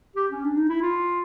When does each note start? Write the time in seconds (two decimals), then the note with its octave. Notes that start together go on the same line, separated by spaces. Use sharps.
0.16 G4
0.31 C#4
0.44 D4
0.57 D#4
0.69 E4
0.82 F4